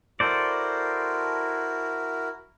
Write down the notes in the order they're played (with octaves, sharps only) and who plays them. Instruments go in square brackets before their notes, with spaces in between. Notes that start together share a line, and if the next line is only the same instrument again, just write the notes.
[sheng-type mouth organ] E4 F#4 A#4 [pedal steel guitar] A4 C5 D5